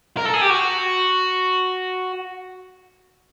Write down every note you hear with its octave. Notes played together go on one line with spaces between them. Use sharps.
A#4
A4
G#4
G4
F#4